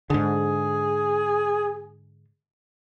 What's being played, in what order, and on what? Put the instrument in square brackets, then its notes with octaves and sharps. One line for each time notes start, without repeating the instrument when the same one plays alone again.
[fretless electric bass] G#2 D3 [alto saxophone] G#4